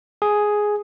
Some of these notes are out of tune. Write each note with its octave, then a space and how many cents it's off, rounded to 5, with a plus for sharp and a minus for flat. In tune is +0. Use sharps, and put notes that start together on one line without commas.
G#4 +5